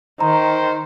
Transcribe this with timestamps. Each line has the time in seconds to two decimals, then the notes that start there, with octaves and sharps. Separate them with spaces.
0.21 D#3 C5 A#5